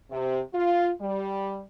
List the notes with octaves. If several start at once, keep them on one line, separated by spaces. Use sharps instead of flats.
C3
F4
G3